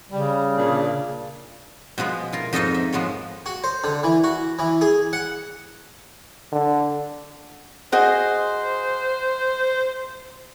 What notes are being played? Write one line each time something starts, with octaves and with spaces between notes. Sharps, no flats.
C#3 G3
A#2 D4
B2 F3 G#3 B3
E4 F4 A#4
F2 G#2 D#4 A4 D#5 F5
E5
F3 G#3 B3 C#5
F#4
C5
D3
E3
F#4
E3
G#4
F#5
D3
F#4 G#4 C5 D#5